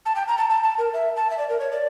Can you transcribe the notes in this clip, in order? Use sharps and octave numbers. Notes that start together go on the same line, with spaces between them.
A5
G5
A#5
A5
A5
A5
A#4
E5
A5
E5
D5
A#4
C#5
D5